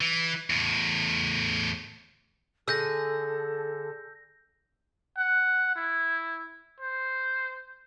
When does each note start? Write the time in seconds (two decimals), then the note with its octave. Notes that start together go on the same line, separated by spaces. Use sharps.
0.01 E3
0.50 E2 A2
2.68 D3 G#4 A4 E6 G6 A#6
5.18 F#5
5.76 E4
6.81 C5